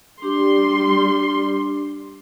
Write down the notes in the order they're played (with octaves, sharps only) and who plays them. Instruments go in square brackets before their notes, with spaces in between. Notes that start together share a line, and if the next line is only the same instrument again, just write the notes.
[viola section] G3 C6 [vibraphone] D4 G4 D6